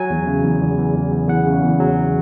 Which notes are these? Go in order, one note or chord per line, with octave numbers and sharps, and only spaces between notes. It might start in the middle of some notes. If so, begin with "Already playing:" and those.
Already playing: F#3 G#5
E2
C#3
E2
E2
E2
E2
E2
E2 F#5
C#3
E2
F#3